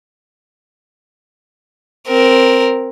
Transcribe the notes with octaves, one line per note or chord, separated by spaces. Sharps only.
C4 A#4